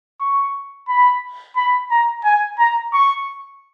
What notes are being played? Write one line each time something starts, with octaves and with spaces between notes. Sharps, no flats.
C#6
B5
B5
A#5
G#5
A#5
C#6